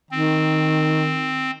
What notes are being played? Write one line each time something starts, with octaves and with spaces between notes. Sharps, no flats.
D#3 C4